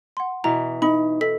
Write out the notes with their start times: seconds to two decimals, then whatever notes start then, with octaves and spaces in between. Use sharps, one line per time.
0.17 F#5 C6
0.44 B2 E3 A#5
0.82 D#4 B5
1.21 A4 D#5 B6